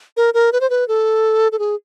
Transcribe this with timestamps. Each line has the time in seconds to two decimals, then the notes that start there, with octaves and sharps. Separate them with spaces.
0.17 A#4
0.34 A#4
0.53 B4
0.61 C5
0.70 B4
0.88 A4
1.52 A4
1.59 G#4